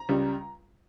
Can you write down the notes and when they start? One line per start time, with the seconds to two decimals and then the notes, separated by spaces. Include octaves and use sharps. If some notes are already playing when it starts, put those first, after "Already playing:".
Already playing: A#5
0.09 C#2 C#3 G3